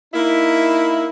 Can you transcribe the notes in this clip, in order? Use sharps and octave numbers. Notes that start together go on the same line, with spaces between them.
A#3 D#4 E4